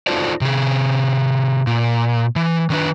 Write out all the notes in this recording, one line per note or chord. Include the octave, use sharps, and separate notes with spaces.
D#4 F4 F#4 A4 C5 D5
C3 G#4
A#2
E3
D#3 D4 B4